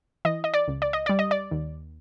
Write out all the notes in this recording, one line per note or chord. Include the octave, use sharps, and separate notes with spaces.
E3 D#5
D#5
D5
C#2
D5
D#5
G3 D5
D#5
D5
D#2